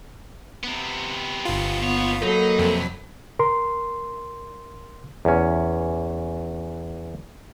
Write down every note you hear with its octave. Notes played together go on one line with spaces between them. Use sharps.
C3 B3
G1 F4
D#2 B3 C#5
F#3 A#3 D#4 A4 B4
F2 C3
A#4 C6
E2 C#4